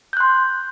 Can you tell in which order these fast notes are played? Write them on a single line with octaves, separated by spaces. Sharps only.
G6 F#6 C6